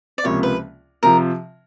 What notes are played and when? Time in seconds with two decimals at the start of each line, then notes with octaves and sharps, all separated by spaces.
0.18 D5
0.24 C#2 C3 F3 A#3 C#5
0.43 B4
1.03 C3 F3 A#4